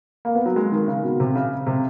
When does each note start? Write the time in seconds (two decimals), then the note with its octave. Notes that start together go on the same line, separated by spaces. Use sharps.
0.25 A#3
0.35 B3
0.46 F#3
0.56 G#3
0.72 D#3
0.88 C#3
1.03 B2
1.20 C3
1.35 C#3
1.67 C3